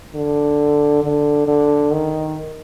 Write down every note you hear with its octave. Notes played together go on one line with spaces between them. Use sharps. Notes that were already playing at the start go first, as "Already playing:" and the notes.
D3
D3
D3
D#3